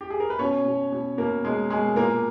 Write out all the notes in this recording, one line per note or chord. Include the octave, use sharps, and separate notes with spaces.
G4
G#4
A#4
B4
B2 C#4 C#5
B2
B2
B2 A#3 A#4
B2 G#3 G#4
B2 G#3 G#4
A#2 A#3 A#4